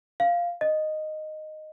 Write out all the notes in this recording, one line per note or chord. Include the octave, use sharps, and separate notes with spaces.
F5
D#5